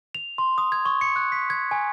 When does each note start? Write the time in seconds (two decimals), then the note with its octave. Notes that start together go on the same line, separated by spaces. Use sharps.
0.15 F7
0.38 C6
0.58 D#6
0.72 G#6
0.86 C#6
1.01 C#7
1.16 F#6
1.32 B6
1.50 G#6
1.71 G#5